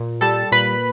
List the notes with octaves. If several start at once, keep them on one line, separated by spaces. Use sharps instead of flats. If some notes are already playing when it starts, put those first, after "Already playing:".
Already playing: A#2
G3 A4 A5
A#2 B4 B5